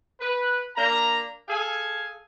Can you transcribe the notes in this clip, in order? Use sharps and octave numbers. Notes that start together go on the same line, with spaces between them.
B4
A#3 D4 A#5
G#4 A4 F5 G#5